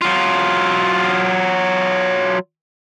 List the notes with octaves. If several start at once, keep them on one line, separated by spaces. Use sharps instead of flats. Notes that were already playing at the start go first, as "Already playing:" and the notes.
F#3 F4